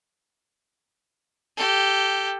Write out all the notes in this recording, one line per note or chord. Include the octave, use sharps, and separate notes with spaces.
G4 A4